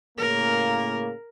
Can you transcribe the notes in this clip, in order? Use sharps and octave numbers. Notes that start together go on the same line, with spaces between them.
A2 C#3 A#3 A#4